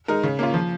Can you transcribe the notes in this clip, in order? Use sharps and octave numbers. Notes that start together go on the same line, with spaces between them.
G#3 D#4 A#4
C#3
A#3 C#4 F4
F3